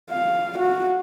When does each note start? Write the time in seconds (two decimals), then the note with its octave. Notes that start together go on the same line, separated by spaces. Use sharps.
0.11 F5
0.59 F#4